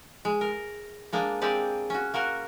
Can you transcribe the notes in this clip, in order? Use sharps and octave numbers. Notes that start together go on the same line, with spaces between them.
G#3
A#4
G#3 A#3 D4
G#3 A#3 C4 G4 D5
C#4 F#4
A#3 F#4 A#4 F#5